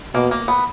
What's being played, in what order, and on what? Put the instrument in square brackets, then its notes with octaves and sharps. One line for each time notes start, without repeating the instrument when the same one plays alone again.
[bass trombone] B2 [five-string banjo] A#3
[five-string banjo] A#3
B3